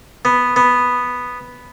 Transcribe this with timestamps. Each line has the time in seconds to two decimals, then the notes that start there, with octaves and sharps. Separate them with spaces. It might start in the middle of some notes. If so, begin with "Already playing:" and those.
0.25 B3
0.56 B3